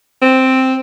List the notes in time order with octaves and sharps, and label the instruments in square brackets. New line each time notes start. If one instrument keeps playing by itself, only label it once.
[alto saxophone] C4